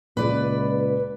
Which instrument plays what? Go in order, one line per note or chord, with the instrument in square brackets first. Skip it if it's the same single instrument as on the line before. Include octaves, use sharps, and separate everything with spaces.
[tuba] C#2 [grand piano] A#2 [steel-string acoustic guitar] B4 D5